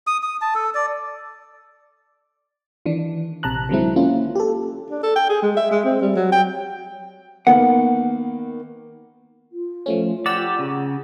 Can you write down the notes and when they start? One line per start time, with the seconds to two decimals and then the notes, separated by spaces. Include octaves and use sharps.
0.07 D#6
0.23 D#6
0.41 A5
0.55 A4
0.75 D5
2.86 D#3 E3 D4
3.43 A#1 C3 A5 A#5 F#6
3.69 D3 D#3 F#3 G#3 C4 E4
3.96 A#3 C#4 E4 F4
4.35 G4 A4
4.90 D4
5.03 A4
5.16 G5
5.29 G#4
5.43 G#3
5.57 E5
5.71 G#3
5.85 C4
6.01 G3
6.16 F#3
6.32 G5
7.47 D#3 A#3 B3 F#5
9.52 F4
9.86 F3 A3 C#4
10.26 G4 D5 F#5 A#5 E6
10.59 C#3